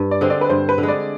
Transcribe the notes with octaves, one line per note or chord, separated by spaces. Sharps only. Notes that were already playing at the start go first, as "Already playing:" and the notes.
Already playing: G2
D5
D3 G#3 C4
D5
B4
G2 C5
B4
D3
G#3
D5